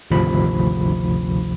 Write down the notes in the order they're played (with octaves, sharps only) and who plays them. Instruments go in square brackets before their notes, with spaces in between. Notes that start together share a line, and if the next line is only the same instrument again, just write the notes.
[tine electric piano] G#1 D2 C3 F3 B5